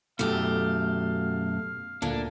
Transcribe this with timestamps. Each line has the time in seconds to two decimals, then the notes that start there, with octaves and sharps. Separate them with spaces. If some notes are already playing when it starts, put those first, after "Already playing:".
0.19 F#2 B2 A3 G4 F5
2.02 D2 A#2 D4